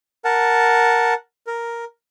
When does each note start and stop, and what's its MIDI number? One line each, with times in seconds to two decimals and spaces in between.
0.25 1.14 70
0.25 1.14 78
0.25 1.14 81
1.47 1.84 70